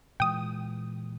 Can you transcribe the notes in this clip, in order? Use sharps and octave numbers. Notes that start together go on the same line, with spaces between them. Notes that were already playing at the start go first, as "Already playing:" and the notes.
A#2 E3 G#3 G5 D#6